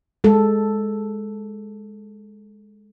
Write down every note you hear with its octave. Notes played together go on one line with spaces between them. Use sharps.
G#3 A4